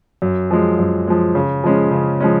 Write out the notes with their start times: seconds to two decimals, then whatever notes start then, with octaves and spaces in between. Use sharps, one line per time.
0.22 F#2
0.51 F3 G#3
0.79 F#2
1.07 F3 G#3
1.35 C#3
1.64 F3 G#3 C#4
1.91 C#3
2.21 F3 G#3 C#4